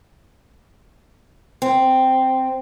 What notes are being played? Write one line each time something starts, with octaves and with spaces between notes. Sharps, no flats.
C4